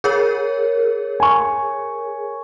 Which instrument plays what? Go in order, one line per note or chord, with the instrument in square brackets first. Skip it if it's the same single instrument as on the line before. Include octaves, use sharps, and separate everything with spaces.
[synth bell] G#4 A#4 C#5
[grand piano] G#5 C#6